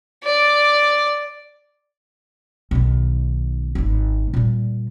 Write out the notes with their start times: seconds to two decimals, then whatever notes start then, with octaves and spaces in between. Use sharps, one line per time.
0.24 D5
2.71 B1 D#3
3.75 G#1 D#4
4.34 A#2 G3